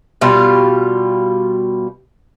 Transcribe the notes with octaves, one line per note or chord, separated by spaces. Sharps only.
B2 G3 F4